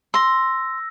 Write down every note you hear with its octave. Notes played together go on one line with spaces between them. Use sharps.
C6 E6 A#6